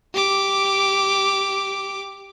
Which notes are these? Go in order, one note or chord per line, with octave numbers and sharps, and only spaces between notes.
G4 D6